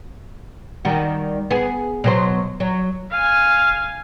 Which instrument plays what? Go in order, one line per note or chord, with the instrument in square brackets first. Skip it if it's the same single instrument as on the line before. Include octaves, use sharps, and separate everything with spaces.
[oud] D#3 G3 F#4
B3 G#4
B2 F#3 C5
F#3
[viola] F5 G#5